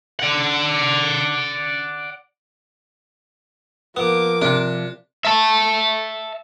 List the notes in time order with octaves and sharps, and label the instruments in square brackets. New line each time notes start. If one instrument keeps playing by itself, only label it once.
[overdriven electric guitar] D5 F#5
[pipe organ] F3 [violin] A#3 D6 [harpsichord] B3
[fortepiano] C3 [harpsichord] D4
[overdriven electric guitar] E5 A5